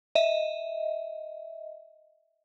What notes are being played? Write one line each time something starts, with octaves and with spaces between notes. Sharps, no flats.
D#5 E5